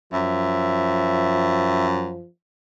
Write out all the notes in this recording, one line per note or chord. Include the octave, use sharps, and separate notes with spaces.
F#2 F3 E5